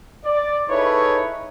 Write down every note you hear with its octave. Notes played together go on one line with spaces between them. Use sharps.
D5
D#4 E4 G#4 A4 B4 C#5